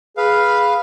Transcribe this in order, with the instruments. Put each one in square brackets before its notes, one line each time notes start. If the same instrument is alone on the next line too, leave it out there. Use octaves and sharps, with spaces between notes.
[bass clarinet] G#4 [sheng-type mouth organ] B4 F5